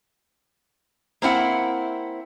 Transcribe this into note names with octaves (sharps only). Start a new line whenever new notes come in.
A#3 C4 E4 F#5